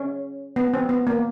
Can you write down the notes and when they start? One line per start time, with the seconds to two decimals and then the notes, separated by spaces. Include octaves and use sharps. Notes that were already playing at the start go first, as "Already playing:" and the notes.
Already playing: C#4
0.56 B3
0.74 C4
0.89 B3
1.07 A#3